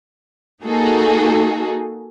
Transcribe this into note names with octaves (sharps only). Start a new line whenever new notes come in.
A#3 D#4 F#4 G#4 A4